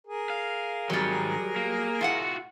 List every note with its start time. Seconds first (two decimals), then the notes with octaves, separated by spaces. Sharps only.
0.07 G#4 A#4
0.30 F5
0.90 G#2 D#3 F#3 G3
1.56 A#3
2.01 A2 F4 F#4 F5 F#5